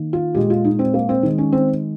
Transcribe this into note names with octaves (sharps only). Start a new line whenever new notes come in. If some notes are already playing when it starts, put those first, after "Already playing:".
Already playing: D#3 A#3
F4
A#2 G#3 G4
F4
D#4
C4
A#3
C4
D#3 G#3
C#4
C4